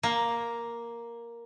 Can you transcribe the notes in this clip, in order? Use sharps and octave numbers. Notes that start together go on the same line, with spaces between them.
A#3